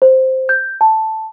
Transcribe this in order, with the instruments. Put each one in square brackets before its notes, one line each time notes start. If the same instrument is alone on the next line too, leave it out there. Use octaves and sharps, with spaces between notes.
[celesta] C5
G6
A5